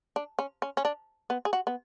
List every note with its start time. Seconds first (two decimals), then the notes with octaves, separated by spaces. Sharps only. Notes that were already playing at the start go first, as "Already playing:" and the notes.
0.16 D4
0.39 C#4
0.62 C#4
0.77 C#4
0.85 D4
1.30 B3
1.45 G#4
1.53 F#4
1.67 B3